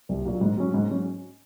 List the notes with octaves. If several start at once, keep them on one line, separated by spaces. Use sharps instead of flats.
C2
A#2 F#3 A#3
G#2
F#3 C#4
G#2
F#3 C#4